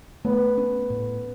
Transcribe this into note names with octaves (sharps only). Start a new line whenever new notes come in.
A3 B3
C#4
A2